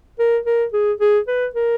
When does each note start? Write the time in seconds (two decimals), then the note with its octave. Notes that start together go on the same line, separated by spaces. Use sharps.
0.19 A#4
0.46 A#4
0.73 G#4
1.00 G#4
1.28 B4
1.55 A#4